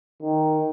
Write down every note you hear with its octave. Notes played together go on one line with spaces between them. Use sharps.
D#3